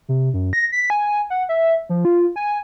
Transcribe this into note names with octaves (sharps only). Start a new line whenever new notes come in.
C3
F#2
A#6
B6
G#5
F#5
E5
F3
F4
G#5